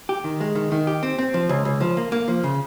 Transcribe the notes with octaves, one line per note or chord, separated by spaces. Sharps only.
G4
D#3
G#3
D#3
D#3
G4
C4
C4
F3
C#2
C#2
F3
A#3
A#3
F3
C#3